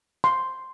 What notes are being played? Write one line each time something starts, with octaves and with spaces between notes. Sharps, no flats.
C6